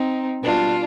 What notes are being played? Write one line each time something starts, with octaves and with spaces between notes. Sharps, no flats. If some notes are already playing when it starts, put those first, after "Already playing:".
Already playing: C4 D#4
B2 G3 D4 F4